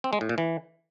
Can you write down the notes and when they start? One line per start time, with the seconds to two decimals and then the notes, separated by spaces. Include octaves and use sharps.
0.04 C4
0.13 G#3
0.21 A2
0.29 A#2
0.38 E3